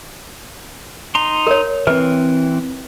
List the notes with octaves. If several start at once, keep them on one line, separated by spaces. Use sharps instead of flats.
D#4 A#5 C6
A#4 C#5
E3 C4 B4